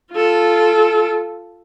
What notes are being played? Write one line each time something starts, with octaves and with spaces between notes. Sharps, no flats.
F4 A4